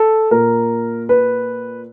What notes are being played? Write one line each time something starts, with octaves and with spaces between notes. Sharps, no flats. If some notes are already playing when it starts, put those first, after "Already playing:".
Already playing: A4
A#2 A#4
B4